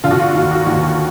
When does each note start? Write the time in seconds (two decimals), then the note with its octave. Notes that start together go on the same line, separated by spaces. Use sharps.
0.04 D3 F4
0.11 F#4
0.19 F4
0.35 D#2
0.51 F#4
0.67 D#2